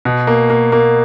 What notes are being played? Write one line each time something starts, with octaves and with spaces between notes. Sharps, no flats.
B2
A#3
A#3
A#3